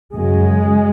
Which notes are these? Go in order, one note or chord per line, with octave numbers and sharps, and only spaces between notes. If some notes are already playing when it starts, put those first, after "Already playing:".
F#2 C#3 G#3